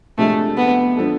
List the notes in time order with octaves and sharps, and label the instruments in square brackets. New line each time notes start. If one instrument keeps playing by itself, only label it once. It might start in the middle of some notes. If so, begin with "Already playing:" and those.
[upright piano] C3 F3 G#3 D4 [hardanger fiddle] A3
[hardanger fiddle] B3
[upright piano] D3 F3 B3 D4 A4